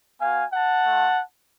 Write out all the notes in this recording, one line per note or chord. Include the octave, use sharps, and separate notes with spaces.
B3 F#4 F5 G#5
F#5 A5
A3 F4